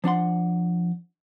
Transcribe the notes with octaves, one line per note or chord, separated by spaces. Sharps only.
F3 D4 F#5 C6